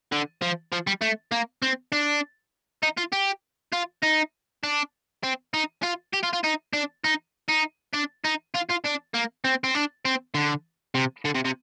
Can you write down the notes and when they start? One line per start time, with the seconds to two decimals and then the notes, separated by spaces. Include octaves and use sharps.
0.12 D3
0.42 F3
0.72 F3
0.87 G3
1.02 A3
1.32 A#3
1.62 C4
1.92 D4
2.83 D#4
2.98 F4
3.13 G4
3.73 F4
4.03 D#4
4.63 D4
5.24 C4
5.54 D#4
5.83 F4
6.14 G4
6.23 F4
6.33 F4
6.44 D#4
6.73 D4
7.04 D#4
7.49 D#4
7.94 D4
8.24 D#4
8.54 F4
8.69 F4
8.84 D4
9.14 A#3
9.44 C4
9.64 C4
9.75 D4
10.05 C4
10.35 D3
10.95 C3
11.25 D3
11.35 C3
11.45 C3